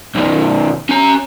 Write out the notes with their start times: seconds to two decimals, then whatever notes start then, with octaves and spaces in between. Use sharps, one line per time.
0.15 B1 D#3
0.89 C#4 A#5